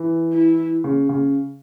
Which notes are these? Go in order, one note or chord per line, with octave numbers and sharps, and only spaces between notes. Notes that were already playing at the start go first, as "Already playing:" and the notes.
Already playing: E3
E4
C#3
C#3